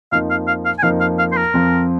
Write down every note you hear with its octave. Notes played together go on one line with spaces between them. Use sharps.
F2 F3 A#3 D#4 F5
F5
F5
F5
G#5
F2 F3 A#3 D#4 F5
F5
F5
C5
A#4
F2 F3 C4